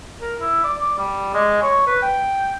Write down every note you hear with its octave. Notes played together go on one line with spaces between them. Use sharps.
A#4
E4
D5
D5
G3
G#3
C#5
B4
G5